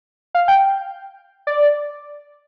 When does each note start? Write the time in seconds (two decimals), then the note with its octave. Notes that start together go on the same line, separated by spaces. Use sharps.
0.35 F5
0.48 G5
1.47 D5